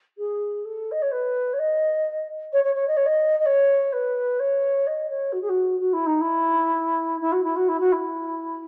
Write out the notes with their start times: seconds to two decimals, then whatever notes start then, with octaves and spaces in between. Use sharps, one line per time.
0.18 G#4
0.64 A4
0.91 D#5
1.02 C#5
1.11 B4
1.53 C#5
1.58 D#5
2.52 C#5
2.64 C#5
2.74 C#5
2.87 D#5
2.96 C#5
3.06 D#5
3.39 D#5
3.45 C#5
3.92 B4
4.39 C#5
4.86 D#5
5.09 C#5
5.32 F#4
5.41 G#4
5.49 F#4
5.80 F#4
5.93 E4
6.06 D#4
6.20 E4
7.21 E4
7.32 F#4
7.43 E4
7.56 F#4
7.68 E4
7.80 F#4
7.92 E4